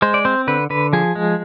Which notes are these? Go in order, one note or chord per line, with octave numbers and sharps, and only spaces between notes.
G#3 C5
D5
C4 C5
D3 B4
D3 B4
F3 G#4
G#3